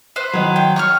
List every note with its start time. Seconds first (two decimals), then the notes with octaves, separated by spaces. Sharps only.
0.16 B4 C5
0.33 D#3 F#3
0.56 G5
0.76 C#5 C#6 F6